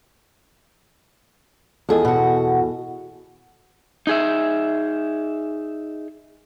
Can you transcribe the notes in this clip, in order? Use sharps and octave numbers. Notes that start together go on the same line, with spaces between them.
E2 F3 G#4 A4 D#5 G#5
B2 F#4
D#4 G#4 E5